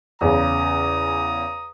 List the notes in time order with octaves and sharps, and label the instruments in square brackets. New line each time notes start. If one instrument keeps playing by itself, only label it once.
[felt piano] E2 C#3 [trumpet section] A#5 D#6